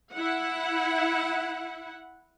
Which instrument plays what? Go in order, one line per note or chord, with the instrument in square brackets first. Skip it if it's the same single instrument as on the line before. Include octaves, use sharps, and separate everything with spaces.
[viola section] E4 F#5